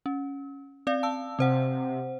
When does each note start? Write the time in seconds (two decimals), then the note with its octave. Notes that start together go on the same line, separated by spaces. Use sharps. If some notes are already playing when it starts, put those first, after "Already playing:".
0.06 C#4
0.87 C4 D5 F5
1.03 A5 E6
1.39 C3 C4 C5 F#5